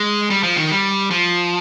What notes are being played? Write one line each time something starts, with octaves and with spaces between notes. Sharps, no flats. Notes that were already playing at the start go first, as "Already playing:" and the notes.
Already playing: G#3
G3
F3
D#3
G3
F3